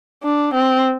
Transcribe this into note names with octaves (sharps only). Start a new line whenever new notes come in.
D4
C4